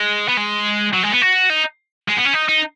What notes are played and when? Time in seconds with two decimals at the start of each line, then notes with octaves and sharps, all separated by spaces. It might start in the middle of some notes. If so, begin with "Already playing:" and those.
Already playing: G#3
0.28 B3
0.37 G#3
0.93 F#3
1.03 G#3
1.12 B3
1.22 F#4
1.50 D#4
2.09 G#3
2.17 B3
2.26 C#4
2.34 D#4
2.48 D#4